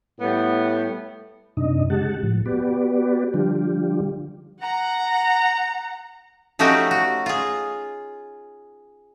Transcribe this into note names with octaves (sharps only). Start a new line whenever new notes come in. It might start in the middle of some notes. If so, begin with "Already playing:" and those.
A2 G3 B3
F#2 C3 D4 D#4 D#5
C#3 G#3 G4 F#5 A5
A2 F3
B3 F#4 G4 B4 D5
D3 F3 G3 D4 F4 G4
F#5 A#5
F3 A3 C#4 D#4 F#4 G4
F#4
F4 G#4